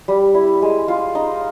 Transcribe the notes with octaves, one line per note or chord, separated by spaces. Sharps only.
G3
E4
G#3
F4
D#4